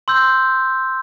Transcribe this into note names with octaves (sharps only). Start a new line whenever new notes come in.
C6 E6 G6